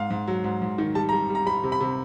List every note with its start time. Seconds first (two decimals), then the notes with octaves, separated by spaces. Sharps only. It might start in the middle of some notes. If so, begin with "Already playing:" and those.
Already playing: G#2 F5
0.10 G#2
0.27 F#3
0.44 G#2
0.62 G#2
0.78 D#3
0.95 G3 A5
1.09 A#5
1.12 G3
1.30 G3
1.35 A#5
1.46 G3 B5
1.63 C3
1.72 B5
1.80 C3